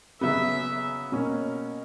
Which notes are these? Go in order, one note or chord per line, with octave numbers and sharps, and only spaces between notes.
C#3 F#3 B3 E5
B2 A#3 C#4